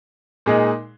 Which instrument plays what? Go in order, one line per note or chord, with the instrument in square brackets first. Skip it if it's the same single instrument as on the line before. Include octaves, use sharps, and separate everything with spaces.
[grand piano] A#2 G#3 D#4 G#4